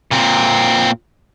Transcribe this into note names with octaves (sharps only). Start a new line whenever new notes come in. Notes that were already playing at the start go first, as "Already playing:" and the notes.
A#2 C4